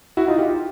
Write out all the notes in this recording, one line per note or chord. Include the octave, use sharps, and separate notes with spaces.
E4 F#4
D#4 F4
F4 G4